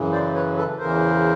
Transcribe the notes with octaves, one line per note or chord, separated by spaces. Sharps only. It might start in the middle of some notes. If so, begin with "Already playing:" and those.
Already playing: F#2 C#3 E3
C5 D5
B4 C#5
A4 B4
E2 C#3 E3 A#4 C5